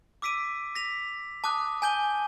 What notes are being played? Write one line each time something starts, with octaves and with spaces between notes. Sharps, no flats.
D6 E6 B6 D7 D#7
A#6 B6 F7
A5 D6 D#6 F#6
G#5 A5 G6 D#7 G7